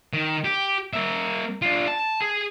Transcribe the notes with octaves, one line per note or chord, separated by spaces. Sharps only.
D#3
G4
A#3 E5
D4 F4
A5
G#4